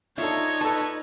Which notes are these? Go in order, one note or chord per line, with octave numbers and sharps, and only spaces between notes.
D4 D#4 F4 A4 C#5 E5
A4 B4 A5